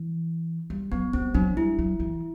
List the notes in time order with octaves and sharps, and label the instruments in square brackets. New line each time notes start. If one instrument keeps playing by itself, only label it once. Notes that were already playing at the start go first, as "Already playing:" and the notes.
Already playing: [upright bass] E3
G3
[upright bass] F#3 [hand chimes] B3
[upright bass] G3 [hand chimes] C4
[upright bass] F#3 [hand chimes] D4
[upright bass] G3 [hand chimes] E4
[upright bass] F#3
E3